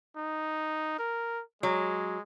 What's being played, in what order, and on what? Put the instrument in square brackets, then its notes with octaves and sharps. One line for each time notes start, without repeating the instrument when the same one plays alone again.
[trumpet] D#4
A#4
[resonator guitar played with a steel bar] F#3 [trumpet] G#3